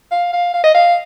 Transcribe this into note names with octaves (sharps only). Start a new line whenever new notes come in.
F5
F5
F5
D#5
F5